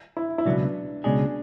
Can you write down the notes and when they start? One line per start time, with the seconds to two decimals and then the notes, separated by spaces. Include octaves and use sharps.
0.17 E4
0.38 E4
0.45 C#2 B2 F#3 B3 D4
1.04 C#2 B2 G#3 C#4 D4 G#4